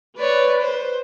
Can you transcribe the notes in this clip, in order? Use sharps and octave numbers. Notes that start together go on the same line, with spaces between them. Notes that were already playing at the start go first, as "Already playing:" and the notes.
B4 C#5 D5
C5